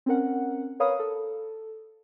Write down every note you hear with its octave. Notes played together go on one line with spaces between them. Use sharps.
C4 C#4 A#4 F#5
A#4 B4 C#5 F5 B5 D#6
A4